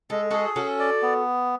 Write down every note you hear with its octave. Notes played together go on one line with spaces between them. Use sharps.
G#3 A4
F#4 G#4 A4
C#4 F#4 A4
D5
B3